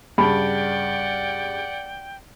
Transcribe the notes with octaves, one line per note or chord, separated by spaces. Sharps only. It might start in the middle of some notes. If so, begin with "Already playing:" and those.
G2 C#3 D5 F#5 G5 A5 B5